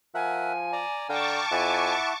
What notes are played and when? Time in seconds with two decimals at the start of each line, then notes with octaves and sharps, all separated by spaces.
0.15 F3 A#4 E5 F#5 G#5
0.73 D5 A#5
1.09 D3 F5 G5 A5 A#5 C#6 D6
1.51 F2 E4 E5 F#5 G#5